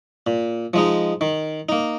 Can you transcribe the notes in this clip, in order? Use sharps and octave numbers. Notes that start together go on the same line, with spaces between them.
A#2
F3 G#3 D#4
D#3
A#3 D#4